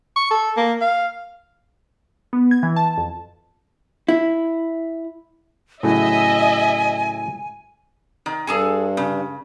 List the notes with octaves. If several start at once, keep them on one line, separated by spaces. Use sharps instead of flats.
C#6
A4
A#3
F5
B3
G#6
E3
A5
F2
E4
A2 C#3 F#3 D#5 E5 G#5
D#3
G2 G#4 A4 G#5
C#3